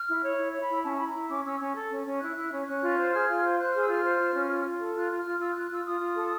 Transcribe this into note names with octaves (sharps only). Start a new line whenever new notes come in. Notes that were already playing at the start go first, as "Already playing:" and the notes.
Already playing: F6
E4
C#5
E4
C#5
B5
E4
C#4 A5
E4 B5
A#5
E4
C#4 D6
C#4 E6
C#4
A4
C#4
C#4
E4 F#6
E4
C#4
C#4 F#6
F4
C5
G#4 F6
F4
C5
C5 F#6
G#4 F6
E6
F4 F6
C5
F4
C#4
F4
F4
A4
F4 F#6
F4
F6
F4
F4 E6
F#6
F4
F#6
F4 E6
F4 D#6
F4
A4